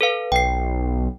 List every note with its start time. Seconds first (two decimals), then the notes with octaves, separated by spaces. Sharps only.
0.01 A4 B4 F5
0.32 B1 G5 C7